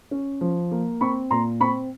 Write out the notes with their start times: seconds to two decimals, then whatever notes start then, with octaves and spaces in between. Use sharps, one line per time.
0.11 C#4
0.41 F3
0.71 A#3
1.01 C4 B5 C#6
1.31 A#2 A#5 C6
1.60 C4 B5 C#6